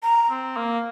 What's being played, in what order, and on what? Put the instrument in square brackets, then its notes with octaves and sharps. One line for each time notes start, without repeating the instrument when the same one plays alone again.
[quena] A#5
[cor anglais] C4
A#3